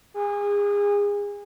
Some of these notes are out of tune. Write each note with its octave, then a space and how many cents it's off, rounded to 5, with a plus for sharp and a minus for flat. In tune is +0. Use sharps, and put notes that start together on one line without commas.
G#4 -30